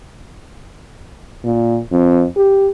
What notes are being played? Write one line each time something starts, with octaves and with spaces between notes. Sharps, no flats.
A#2
F2
G4